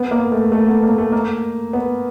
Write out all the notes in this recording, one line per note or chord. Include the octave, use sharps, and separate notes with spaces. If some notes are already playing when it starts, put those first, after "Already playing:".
Already playing: B3
A#3
A3
A3
B3
A#3
A3
A#3
B3